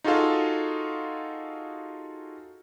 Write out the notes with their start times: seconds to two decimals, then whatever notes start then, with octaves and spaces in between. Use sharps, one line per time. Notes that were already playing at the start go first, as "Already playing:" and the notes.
0.04 D#4 F4 F#4 G#4 A4 F5